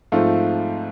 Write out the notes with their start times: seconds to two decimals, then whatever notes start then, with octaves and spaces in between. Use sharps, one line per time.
0.12 G#2 F3 A3 C4 F4